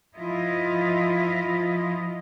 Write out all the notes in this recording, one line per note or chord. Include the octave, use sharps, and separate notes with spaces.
F3 E4 F4 D#5